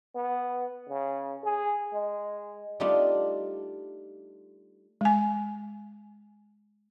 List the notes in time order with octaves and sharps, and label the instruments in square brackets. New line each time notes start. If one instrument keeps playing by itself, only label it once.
[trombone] B3
C#3
G#4
G#3
[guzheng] G3 A3 D4 D#4 F4
[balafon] G#3 G#5